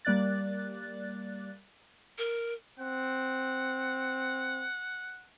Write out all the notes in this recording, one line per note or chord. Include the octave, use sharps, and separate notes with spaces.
G3 A#3 D5 F#6 A6
A#4
C4 F#5